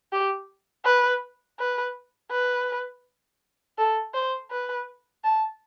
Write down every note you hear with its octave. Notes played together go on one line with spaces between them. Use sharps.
G4
B4
B4
B4
A4
C5
B4
A5